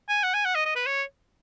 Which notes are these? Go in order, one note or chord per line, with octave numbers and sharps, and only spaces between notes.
G#5
F#5
G#5
F#5
D#5
D#5
B4
C#5